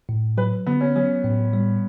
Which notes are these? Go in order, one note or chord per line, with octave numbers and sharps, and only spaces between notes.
A2
F#3 B4
D3 B3
C#4
F#3 C#4
A2
G3